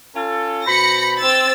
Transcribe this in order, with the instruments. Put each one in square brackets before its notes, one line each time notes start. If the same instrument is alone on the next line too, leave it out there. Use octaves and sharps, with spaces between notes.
[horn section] C#4 F4 A4
[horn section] B2 C5 B5 [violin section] A#6 C#7
[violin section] C4 E6 A6